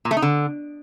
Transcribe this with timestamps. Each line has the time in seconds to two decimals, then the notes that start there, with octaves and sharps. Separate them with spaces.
0.05 A#2
0.11 A3
0.17 D#4
0.22 D3